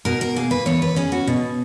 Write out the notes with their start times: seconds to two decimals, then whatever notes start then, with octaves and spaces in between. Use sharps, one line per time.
0.05 B2 A#4
0.21 A#4
0.36 A#3 G#4
0.51 B4
0.66 E2 C#5
0.82 B4
0.96 C#4 G#4
1.12 F#4
1.27 B2